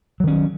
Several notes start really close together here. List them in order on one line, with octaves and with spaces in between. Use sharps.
F#3 D#3 C#4